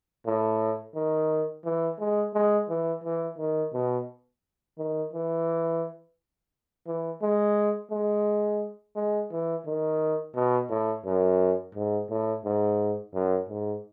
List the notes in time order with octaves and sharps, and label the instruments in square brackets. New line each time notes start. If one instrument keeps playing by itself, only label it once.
[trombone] A2
D#3
E3
G#3
G#3
E3
E3
D#3
B2
D#3
E3
E3
G#3
G#3
G#3
E3
D#3
B2
A2
F#2
G#2
A2
G#2
F#2
G#2